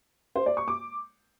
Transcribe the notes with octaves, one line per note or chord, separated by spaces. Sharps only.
C5
D5
C#6
D6